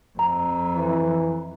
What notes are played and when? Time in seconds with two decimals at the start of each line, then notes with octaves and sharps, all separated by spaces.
0.19 F2 A#5
0.76 E3